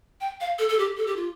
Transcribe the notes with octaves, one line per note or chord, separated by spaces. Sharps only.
G5
F5
A4
A4
G4
A4
G4
F4